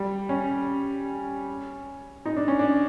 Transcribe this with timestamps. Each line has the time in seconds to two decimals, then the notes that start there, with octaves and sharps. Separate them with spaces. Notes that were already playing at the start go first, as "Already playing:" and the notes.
Already playing: G3
0.29 C#4
2.26 D#4
2.37 D4
2.48 C#4
2.59 D4